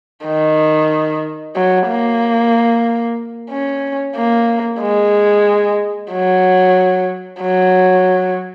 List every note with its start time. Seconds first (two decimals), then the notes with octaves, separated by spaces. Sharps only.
0.26 D#3
1.56 F#3
1.88 A#3
3.51 C#4
4.16 A#3
4.80 G#3
6.11 F#3
7.41 F#3